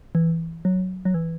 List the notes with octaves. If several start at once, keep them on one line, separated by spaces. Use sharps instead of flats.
E3
F#3
F#3
E3